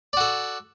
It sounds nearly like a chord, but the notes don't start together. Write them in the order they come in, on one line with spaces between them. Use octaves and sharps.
D5 F#4 A4